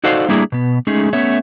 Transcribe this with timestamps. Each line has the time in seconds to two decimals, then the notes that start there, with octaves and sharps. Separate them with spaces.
0.04 D#4 F#4 A4 C5 D5 F5
0.29 G3 A3 A#3 D4 E4 G#4
0.52 B2 B3
0.87 G#3 A3 C#4 D#4 G#4
1.13 A3 B3 C#4 C#5 E5